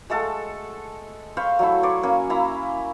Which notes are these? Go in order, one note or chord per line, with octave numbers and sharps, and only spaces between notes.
G#3 A3 A4 F#5
C5 F5 B5 C#6
F#3 A3 E4
C#5 D5 C6
A#3 C#4 G#5
A#3 E4 A#5